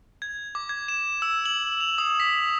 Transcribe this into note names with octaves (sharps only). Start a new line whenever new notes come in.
G#6
D6
G#6
E7
E6
F#7
F7
D#6
B6